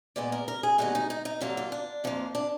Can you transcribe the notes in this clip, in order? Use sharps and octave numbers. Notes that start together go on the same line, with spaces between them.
A#2 G#3 B3 D5
A#4
A#4
G#4
D#2 D3 G#3 B3 F#4
D#4
D#4
D#4
D#2 D3 F#3 A#3 F4
F4
D4
F2 F3 A#3
D4